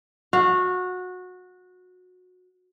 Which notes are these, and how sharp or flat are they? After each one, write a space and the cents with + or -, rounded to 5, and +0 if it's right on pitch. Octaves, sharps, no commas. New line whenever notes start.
F#4 -20 F5 +0